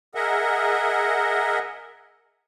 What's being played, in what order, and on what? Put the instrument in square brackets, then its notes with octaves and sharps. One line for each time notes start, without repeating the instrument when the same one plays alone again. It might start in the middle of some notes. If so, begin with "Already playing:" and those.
[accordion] G#4 A#4 D#5 E5 F#5